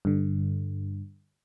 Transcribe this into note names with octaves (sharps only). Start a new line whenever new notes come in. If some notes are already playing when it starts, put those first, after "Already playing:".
G2 D3